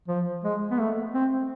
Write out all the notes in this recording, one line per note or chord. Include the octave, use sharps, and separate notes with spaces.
F3
G#3
B3
A3
C4